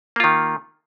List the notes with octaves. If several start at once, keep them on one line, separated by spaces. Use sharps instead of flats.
D#3 A#3 F4